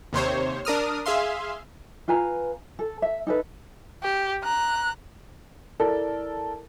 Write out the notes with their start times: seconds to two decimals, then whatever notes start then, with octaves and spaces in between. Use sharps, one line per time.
0.13 D#2 C3 C5 C#5
0.65 D4 A#4 D#6 F6
1.06 G#4 E5 F5 C6
2.08 F4 B4 G#5 A#5
2.79 A4
3.02 E5
3.27 D#4 A4 B4
4.03 G4
4.43 A#5 F#6
5.80 E4 A4 A#4 D5